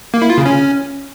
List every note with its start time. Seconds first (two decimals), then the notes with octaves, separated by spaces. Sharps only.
0.14 A#3
0.22 E4
0.30 F4
0.38 C#3
0.46 C#4